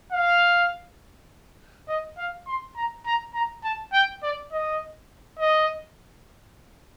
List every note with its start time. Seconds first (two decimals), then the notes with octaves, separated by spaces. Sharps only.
0.12 F5
1.88 D#5
2.18 F5
2.47 C6
2.76 A#5
3.06 A#5
3.34 A#5
3.64 A5
3.93 G5
4.23 D5
4.52 D#5
5.39 D#5